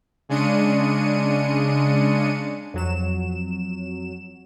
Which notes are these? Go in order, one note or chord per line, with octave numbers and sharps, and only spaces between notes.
C#3 G#3 D4 C#7 D#7
F2 F#3 E7